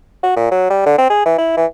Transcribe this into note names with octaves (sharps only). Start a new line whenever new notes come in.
F#4
A#2
F#3
G3
D3
C4
G#4
E3
E4
E3